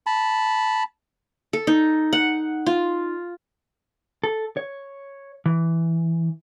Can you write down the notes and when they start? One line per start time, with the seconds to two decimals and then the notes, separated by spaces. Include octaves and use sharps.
0.06 A5 B5
1.53 A4
1.67 D#4
2.13 F#5
2.66 F4
4.24 A4
4.57 C#5
5.46 E3